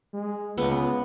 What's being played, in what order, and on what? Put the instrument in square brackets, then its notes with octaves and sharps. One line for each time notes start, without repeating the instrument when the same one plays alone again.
[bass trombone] G#3
[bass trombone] C#2 [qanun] B3